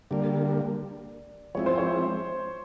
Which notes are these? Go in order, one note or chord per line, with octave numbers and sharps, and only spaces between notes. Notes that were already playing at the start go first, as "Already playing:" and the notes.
D3 G3 A#3 D5
F3 G#3 C4 E4 C#5
C5
C#5